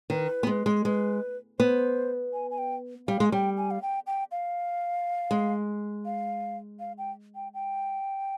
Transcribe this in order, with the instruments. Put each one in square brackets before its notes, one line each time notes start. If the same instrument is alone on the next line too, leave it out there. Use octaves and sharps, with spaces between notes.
[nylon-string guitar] D#3 [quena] B4
[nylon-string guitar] B3
G#3
G#3
[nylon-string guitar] G#3 [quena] B4
[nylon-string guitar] B3 [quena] C5
[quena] G#5
G#5
G5
[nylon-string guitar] G3 [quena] F5
[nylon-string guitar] G#3
[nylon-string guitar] G3 [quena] G5
[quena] G#5
F5
G5
G5
F5
[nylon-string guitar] G#3
[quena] F5
F5
G5
G5
G5